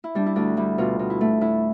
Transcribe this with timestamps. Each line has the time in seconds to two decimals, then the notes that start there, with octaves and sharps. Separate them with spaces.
0.04 E4
0.15 G3 D4
0.26 E4
0.36 D2 D4
0.57 G3 E4
0.78 B2 D4 F4
0.99 B2
1.10 E4
1.21 A3
1.41 A2 E4